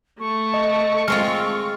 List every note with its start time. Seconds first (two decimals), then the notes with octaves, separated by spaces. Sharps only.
0.20 A3 C#6
0.54 D#5
1.08 G#3 C4 F4 F6